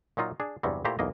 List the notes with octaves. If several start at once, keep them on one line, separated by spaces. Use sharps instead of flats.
A#2 F#3 D#4 F4
D4 G#4
E2 G2 C3 F#3 G3
A#2 A3 E4 G4 C5 A#5
B1 E2 A#3 D#5